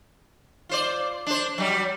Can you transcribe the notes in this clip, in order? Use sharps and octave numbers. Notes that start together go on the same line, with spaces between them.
F4 C5 D5
D4 C5
F#3 G3